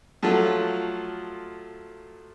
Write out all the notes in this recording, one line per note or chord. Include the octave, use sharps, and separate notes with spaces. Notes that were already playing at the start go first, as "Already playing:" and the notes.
F3 F#3 A3 F4